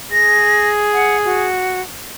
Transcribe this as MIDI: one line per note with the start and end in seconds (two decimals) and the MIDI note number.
0.12 1.49 68
0.12 0.69 94
0.93 1.17 78
1.25 1.81 66